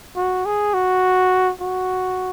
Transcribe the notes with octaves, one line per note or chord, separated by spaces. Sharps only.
F#4
G#4
F#4
F#4